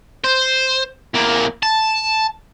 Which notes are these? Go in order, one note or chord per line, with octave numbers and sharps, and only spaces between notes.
C5
E2 A#3
A5